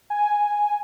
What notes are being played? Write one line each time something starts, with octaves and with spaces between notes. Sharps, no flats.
G#5